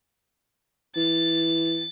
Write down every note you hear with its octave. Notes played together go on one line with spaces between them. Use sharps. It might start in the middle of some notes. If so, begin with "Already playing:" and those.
E3 A6